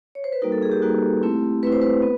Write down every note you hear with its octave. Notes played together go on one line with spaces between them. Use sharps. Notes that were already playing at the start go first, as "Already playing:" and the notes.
C#5
C5
B4
G3 A#3 D#4 F#4 A#4
A4
G#4
G4
G3 A#3 D#4 F#4
A3 C4 E4
A3 C4 E4 B4
C5
B4
B3